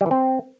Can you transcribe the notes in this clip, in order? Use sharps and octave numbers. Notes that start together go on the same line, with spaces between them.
G3
E3
C4